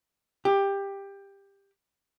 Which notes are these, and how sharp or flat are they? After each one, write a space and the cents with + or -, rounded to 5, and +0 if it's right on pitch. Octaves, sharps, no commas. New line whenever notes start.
G4 +15